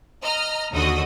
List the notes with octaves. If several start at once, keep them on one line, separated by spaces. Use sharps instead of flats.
D#5 A#5 F6
D#2 D3 F#4 D#5 D#6 A#6